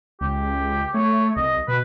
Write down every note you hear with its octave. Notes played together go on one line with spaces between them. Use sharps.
C#2 G4
A3 C#5
C2 D#5
B2 B4